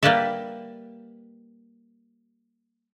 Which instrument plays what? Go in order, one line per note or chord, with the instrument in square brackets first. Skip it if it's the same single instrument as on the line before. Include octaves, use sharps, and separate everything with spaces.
[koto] G3 A#3 G4 B4 D5 E5